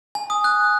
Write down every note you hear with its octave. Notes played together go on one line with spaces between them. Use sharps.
G#5
D#6
F#6